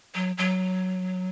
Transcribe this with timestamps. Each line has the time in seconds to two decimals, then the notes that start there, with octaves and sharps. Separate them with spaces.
0.15 F#3
0.38 F#3